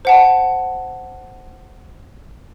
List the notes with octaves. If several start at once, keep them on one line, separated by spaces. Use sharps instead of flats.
C5 F#5 A5